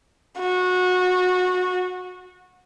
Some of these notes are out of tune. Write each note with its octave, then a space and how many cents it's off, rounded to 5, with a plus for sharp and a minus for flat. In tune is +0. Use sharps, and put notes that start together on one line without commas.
F#4 -20